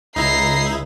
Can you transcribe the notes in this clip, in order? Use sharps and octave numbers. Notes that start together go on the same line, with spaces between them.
C#2 D#4 E4 A#5 C7